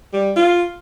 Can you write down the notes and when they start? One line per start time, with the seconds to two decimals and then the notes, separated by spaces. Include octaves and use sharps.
0.14 G3
0.36 F4